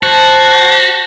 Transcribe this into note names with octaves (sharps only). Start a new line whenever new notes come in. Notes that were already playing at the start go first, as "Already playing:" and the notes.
F#4 C5 A5